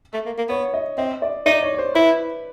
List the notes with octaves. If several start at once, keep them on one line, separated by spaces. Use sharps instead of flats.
A3
A#3
A#3
B3 C#5
D#5
C4 D#5
D5
D#4 D5
C#5
C#5
C5
E4 B4